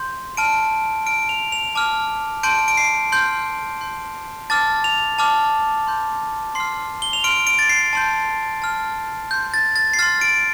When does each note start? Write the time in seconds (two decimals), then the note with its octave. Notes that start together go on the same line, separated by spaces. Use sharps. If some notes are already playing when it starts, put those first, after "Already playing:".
Already playing: C6 G6
0.37 A5 F6 D7
1.06 A5 F6 D7
1.29 F7
1.52 F7
1.75 A5 D6 F6
2.43 A5 C6 G6 D7
2.68 D7
2.77 C7
3.12 C6 F6 G6
3.81 C6 G6
4.50 A5 D6 F6 A6
4.84 F7
5.19 A5 D6 F6
5.87 C6 G6
6.55 C6 F6 C7
7.02 G7
7.13 F7
7.24 C6 F6 D7
7.47 D7
7.59 A6
7.69 C7
7.93 A5 C6 G6
8.62 A5 F6
9.31 C6 G6
9.54 A6
9.76 A6
9.94 C7
9.99 C6 F6 A6
10.21 D7